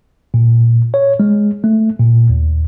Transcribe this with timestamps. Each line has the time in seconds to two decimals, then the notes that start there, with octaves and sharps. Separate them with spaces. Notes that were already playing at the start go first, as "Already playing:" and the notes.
0.34 A#2
0.94 C#5
1.20 G#3
1.64 A3
1.99 A#2
2.29 D#2